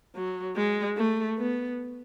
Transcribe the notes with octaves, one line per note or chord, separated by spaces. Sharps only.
F#3
G#3
A3
B3